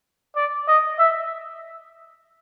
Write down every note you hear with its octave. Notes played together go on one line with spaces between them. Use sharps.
D5
D#5
E5